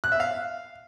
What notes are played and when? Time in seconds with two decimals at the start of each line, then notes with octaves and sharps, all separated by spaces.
0.04 F#6
0.12 E5
0.20 F5